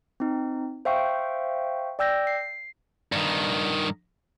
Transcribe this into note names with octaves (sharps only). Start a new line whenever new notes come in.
C4 D#4
C5 E5 F5 G5 C#6
D5 G5 E6 G6 A#6
C7
G2 D#3